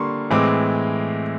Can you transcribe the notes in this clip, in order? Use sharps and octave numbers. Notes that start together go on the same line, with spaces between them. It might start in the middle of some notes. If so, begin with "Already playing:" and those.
Already playing: D3 G3 A#3 C6 C#6
A2 E3 G#3 C4 D6